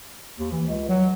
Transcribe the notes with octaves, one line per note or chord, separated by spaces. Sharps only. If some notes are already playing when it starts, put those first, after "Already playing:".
D#2
E3
C#2
F#3